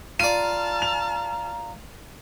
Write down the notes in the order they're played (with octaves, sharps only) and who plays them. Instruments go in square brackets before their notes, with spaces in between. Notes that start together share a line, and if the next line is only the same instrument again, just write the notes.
[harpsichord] F4 D5 [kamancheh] A5 F6 [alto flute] A#5 [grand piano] D#7
[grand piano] F7